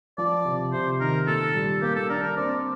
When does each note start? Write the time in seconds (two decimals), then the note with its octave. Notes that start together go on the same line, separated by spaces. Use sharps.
0.18 F3 D5
0.45 C3
0.72 C3 C5
1.00 D#3 A#4
1.27 A#2 A4
1.54 G3
1.82 A#3 G4
1.96 A4
2.09 D4 A#4
2.23 A#4
2.37 C4 D5